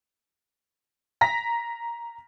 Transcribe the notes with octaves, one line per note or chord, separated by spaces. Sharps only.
A#5 A#6 B6